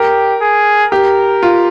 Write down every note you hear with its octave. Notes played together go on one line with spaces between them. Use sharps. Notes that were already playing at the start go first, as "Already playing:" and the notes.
Already playing: G4 A#4
G#4
G4 A#4
F4